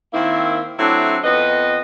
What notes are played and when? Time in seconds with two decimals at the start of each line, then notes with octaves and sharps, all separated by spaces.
0.14 D#3 A#3 C4 E4
0.79 F#3 A3 C4 D4 E4
1.24 F2 B3 B4 D#5